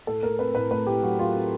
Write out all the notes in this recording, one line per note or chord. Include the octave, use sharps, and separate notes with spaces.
A2 A4
A3 A#4
C4 B4
A2 B4
A3 B4
A2 G4
F#3 F#4
F#3 F4
C4